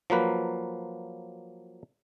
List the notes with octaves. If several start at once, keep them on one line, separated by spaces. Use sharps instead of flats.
F3 F#3 A#3 B4